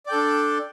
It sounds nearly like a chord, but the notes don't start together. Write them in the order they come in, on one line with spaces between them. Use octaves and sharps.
D5 G5 A4 D4